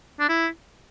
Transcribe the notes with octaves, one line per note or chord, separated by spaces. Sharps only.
D4
E4